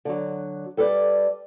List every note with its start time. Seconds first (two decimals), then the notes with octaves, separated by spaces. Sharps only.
0.05 D3 F#3
0.77 G3 A4 B4 D5